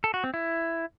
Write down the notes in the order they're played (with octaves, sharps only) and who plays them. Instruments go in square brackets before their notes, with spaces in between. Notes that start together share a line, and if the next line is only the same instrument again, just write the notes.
[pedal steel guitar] A4
F#4
C4
E4